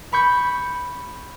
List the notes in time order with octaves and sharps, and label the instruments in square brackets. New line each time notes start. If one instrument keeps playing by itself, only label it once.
[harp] B5 C#6 G6